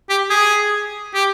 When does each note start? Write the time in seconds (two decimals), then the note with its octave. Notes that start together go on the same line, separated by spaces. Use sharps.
0.10 G4
0.30 G#4
1.14 G4